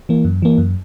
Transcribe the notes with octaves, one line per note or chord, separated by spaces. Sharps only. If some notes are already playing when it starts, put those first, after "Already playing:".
E3 A#3
F#2
E3 A#3
F#2